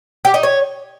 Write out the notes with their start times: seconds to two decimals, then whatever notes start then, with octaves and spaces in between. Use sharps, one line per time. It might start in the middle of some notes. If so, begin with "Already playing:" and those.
0.25 G4
0.34 D#4
0.43 C#5